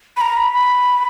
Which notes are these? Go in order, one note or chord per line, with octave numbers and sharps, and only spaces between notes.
B5
A#5
B5
B5